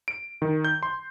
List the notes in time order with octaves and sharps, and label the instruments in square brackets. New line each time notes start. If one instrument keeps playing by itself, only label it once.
[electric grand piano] D7
D#3
G6
C6